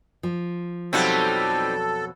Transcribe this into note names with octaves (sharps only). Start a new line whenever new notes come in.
F3
F2 B2 F#3 G3 C4 D#4 A4